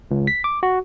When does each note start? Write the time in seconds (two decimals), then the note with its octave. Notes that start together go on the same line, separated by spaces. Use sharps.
0.11 C#2
0.27 B6
0.44 D6
0.63 F#4